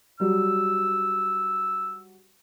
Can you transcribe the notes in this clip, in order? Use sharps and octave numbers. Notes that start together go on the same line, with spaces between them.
F#3 G3 E6